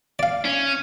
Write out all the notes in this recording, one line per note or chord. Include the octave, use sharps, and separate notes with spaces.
D5 F5
C#4